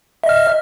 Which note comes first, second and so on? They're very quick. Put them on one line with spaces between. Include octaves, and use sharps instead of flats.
E5 D#5 F6